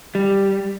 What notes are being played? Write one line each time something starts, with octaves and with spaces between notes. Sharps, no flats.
G3